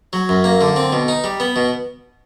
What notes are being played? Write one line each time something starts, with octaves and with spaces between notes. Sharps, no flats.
F#3
F#2
A#3
D3
C4
B2
D#4
G3
B3
B2